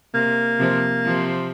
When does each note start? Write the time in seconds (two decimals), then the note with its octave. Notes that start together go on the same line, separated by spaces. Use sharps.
0.14 C3 A#3
0.59 C3 F3
1.05 C3 F3